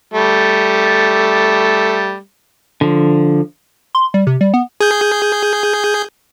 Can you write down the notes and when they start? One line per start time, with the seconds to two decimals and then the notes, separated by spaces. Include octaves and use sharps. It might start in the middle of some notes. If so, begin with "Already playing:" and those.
0.14 G3 A3
2.81 D3 F3
3.95 C6
4.14 G3
4.27 C3
4.41 G3
4.54 B3
4.81 G#4 G6